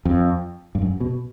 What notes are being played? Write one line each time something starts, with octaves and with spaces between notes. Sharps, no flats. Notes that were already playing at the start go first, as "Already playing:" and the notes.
F2
G2
F#2
B2